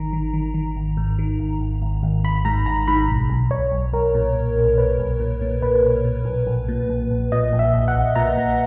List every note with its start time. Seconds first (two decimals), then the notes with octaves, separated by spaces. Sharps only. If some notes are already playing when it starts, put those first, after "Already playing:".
Already playing: G#1 D#3 A#5
0.13 D#3
0.33 D#3
0.54 D#3
0.76 G#1
0.97 G#2
1.19 D#3
1.39 G#1
1.61 G#1
1.82 G#1
2.03 G#1
2.24 G#1 B5
2.45 G#2 A#5
2.66 G#1 A#5
2.88 G#2 B5
3.09 B1
3.30 B1
3.51 B1 C#5
3.72 B1
3.93 B1 A#4
4.15 A#2
4.35 B1
4.56 B1
4.78 A#2 B4
4.99 B1
5.20 A#2
5.41 A#2
5.62 A#2 B4
5.84 B1
6.05 A#2
6.25 B1
6.47 A#1
6.68 A#2
6.89 A#1
7.10 A#1
7.32 A#2 D#5
7.53 A#1
7.59 E5
7.74 A#1
7.88 F#5
7.95 A#1
8.16 A#2 A#5
8.37 A#2